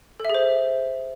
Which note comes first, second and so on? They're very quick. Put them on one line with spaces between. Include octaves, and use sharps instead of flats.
A4 E5 G#4 C5